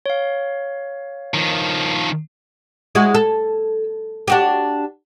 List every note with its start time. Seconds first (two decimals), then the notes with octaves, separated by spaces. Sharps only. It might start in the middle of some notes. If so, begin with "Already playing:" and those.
0.06 C#5 F5
1.34 D#3 F3
2.95 G#3 E4 F#4
3.14 A4
4.28 D4 F#4 G4